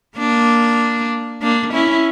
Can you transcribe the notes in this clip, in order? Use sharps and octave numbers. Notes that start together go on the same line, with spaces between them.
A#3 D4
A#3 D4
C#4 E4